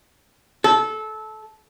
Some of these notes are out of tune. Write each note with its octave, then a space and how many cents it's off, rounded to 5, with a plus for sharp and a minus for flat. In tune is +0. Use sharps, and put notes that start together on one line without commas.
A4 -20